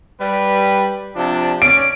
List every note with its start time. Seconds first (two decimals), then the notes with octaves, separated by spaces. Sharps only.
0.20 G3 B4
1.16 C3 F3 D4
1.62 C#4 D5 D7